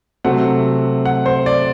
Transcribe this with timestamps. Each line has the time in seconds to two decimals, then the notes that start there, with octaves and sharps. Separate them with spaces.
0.24 C3 F#3 A3 C4 F#5
1.05 F#5
1.26 C5
1.46 D5